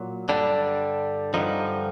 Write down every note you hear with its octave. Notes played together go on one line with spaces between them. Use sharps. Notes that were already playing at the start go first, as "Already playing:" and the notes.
Already playing: A#2 F#3
G2 D3 G3 D4
G2 D3 F3 D#4